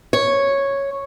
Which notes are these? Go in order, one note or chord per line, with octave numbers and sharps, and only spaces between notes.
C#5